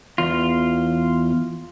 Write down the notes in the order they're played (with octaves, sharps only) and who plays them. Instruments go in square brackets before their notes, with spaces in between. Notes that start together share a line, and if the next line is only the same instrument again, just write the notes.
[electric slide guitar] E2 F4